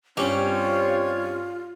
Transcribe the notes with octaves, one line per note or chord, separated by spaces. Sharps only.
G2 G3 C4 C#4 F4 C#5